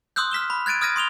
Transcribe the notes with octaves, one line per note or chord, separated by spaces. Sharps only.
C6 D#6 E6 F#6 G6
F6 B6 E7 G7
B5
F#6 G#6 A6 D7 D#7
D#6 F6 G#6 A#6 D#7
C6 D#6 F7 G7